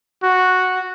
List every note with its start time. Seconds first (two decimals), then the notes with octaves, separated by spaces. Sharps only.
0.23 F#4